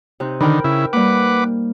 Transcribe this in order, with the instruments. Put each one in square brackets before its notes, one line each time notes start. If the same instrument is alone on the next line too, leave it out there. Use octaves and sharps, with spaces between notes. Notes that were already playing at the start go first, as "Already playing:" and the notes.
[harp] C3 D#4 F#6
[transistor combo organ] D3 D#3 [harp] A#4 G5 B5
[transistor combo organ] C#3 E4
[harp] G3 A#3 [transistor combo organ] B4 F#5 D6